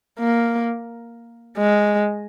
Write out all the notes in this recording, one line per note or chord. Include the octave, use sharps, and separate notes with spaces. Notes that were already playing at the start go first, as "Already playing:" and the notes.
A#3
G#3